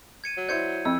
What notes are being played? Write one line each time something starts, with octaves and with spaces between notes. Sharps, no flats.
G#6 C#7 D#7
F#3
E4 C5 D5 G6 G#6 C#7
F2 E6